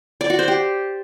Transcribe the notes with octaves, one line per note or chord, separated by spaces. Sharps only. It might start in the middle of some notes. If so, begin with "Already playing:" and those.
D5
F#4
C5
G4